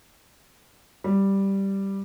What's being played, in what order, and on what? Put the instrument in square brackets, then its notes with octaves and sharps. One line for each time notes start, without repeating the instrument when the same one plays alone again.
[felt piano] G3